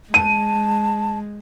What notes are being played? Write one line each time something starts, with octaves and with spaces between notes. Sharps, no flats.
G#3 A5 D#7